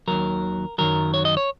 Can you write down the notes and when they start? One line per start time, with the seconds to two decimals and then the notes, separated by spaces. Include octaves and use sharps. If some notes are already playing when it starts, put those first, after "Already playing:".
0.08 D#2 D#3 F#3 A#4
0.78 F#2 D#3 F#3 A#4
1.14 C#5
1.25 D#5
1.37 C#5